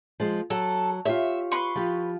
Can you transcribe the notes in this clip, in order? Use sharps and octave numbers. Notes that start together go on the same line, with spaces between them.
F3 G#3
F#3 A4
F4 G4 C#5 E5
B4 C6 C#6
F3 G4